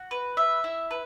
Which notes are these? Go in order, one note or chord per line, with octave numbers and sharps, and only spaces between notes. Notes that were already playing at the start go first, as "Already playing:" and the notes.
Already playing: F#4
B4
E5
E4
B4